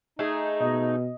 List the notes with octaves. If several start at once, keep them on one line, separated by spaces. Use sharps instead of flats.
A3 D#4 G#4
B2 D#5